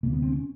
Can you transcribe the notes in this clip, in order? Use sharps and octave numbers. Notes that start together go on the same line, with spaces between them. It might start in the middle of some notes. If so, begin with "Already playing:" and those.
D2 C3 A#3
B3
C4
C#4